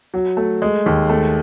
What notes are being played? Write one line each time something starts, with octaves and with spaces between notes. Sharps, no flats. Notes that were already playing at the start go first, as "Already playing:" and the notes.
F#3
A3
G#3
D#2
A3